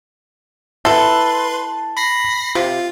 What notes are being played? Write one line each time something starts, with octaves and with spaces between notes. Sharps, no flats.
E4 A4 B4 A5 C6
B5 A#6 C7
C3 F4